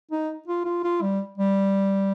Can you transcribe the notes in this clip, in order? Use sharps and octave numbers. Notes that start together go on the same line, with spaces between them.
D#4
F4
F4
F4
G3
G3